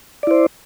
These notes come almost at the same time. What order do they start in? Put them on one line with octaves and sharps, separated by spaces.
D5 E4 C5